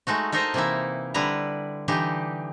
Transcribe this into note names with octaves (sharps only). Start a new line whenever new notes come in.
G#3 A3 D#4 F#4
D#4 A4 A#4 C5 D#5
C3 E3 A#3 D#4 E4
D3 G3 E4 B4 A#5
D3 E3 D#4 G4